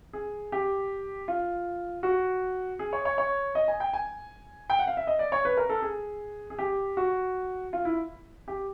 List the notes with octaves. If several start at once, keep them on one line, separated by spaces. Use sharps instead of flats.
G#4
G4
F4
F#4
G#4
C#5
C#5
C#5
D#5
G#5
G5
G#5
G5
F#5
F5
E5
D#5
D5
C#5
B4
A#4
A4
G#4
G#4
G4
F#4
F4
E4
G4